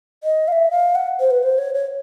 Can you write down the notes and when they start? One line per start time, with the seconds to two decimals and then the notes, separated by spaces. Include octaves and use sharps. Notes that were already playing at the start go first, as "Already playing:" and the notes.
0.24 D#5
0.48 F5
0.52 E5
0.71 F5
0.95 F#5
1.20 C5
1.31 B4
1.43 C5
1.58 C#5
1.75 C#5